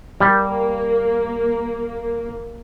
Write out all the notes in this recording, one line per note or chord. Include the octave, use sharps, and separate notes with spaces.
G3 A#3